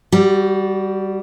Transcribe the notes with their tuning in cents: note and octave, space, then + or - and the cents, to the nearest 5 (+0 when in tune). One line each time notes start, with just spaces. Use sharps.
G3 +0 F#4 +25